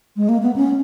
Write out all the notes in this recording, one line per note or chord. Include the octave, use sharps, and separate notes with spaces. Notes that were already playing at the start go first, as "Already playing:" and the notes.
G#3
A#3
B3
C#4